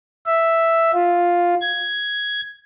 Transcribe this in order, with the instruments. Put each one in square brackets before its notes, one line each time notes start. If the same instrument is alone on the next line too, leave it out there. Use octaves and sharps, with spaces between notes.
[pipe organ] E5
F4
G#6